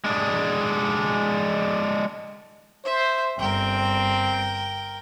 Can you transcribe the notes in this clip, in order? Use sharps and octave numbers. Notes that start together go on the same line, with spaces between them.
G#3 D4
C5 E5
G1 C4 A#4 G5